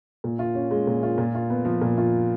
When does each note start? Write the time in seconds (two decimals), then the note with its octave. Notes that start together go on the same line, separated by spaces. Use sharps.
0.24 A#2
0.39 F4
0.55 C#4
0.71 G#3
0.87 A#2
1.03 F4
1.18 A#2
1.35 F4
1.50 B3
1.65 F3
1.82 A#2
1.98 F4